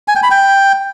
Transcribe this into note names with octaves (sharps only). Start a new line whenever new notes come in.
G#5
G5
B5
G5